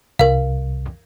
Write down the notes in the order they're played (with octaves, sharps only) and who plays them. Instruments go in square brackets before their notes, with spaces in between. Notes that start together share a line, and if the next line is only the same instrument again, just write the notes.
[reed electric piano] C2 [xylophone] A#4 F5